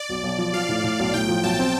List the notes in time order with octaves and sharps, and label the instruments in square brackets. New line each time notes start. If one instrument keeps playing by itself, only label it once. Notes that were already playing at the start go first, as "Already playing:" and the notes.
Already playing: [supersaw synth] D5
[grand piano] B1
B1
F3
[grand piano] F3 [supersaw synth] F5
[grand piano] A2
A2
B1
[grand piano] A2 [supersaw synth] G5
[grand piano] F3
[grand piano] B1 [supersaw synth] A5
[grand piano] C4